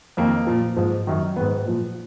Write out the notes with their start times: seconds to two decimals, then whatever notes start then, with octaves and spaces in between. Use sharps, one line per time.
0.17 F2 D#3 A#3
0.47 A#2 F3
0.77 G#2 F3
1.07 F#2 D#3
1.36 G#2 D#3 B3
1.65 A#2 F3